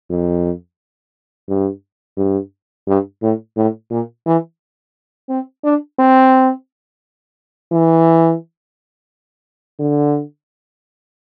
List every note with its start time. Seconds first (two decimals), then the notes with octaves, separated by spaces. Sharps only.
0.10 F2
1.48 G2
2.17 G2
2.87 G2
3.22 A2
3.57 A2
3.90 A#2
4.26 E3
5.29 C4
5.64 D4
5.99 C4
7.72 E3
9.80 D3